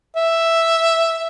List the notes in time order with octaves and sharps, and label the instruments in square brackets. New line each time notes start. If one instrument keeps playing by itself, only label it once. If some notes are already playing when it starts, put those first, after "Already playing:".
[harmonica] E5